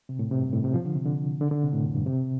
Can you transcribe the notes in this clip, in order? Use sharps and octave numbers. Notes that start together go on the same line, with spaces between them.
C3
A2
C3
G2
A2
C3
F3
D3
C3
D3
D3
D3
C3
A2
F2
G2
C3